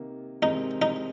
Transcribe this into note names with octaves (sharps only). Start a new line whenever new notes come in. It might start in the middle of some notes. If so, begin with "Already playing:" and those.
Already playing: C3 D#3 A#3
C3 D#3 G#3 C4 D#4
D#4